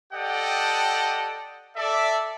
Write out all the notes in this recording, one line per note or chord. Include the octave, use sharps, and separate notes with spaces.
G4 A4 D5 D#5 F#5 G5
A4 D5 E5